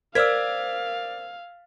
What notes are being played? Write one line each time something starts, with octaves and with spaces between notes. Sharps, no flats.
A#4 C5 D5 F5 E6 F6 G#6 B6